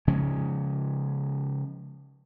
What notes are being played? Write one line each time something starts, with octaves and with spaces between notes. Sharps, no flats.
C#3 F3 G#3 C#4